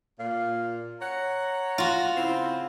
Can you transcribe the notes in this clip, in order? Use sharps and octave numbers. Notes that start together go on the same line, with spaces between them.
A#2 F5
C#5 F#5 A#5
F4 F#4
C#3 C4 E4